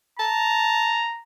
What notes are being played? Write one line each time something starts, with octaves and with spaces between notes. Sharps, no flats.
A5 A#5